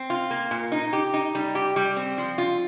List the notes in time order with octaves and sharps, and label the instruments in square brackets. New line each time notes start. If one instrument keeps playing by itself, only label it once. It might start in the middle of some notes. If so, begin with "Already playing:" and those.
Already playing: [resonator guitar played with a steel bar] C4
F4
A#3
A#2
D#4
G4
D#4
G3
G4
G3
C4
F3
F4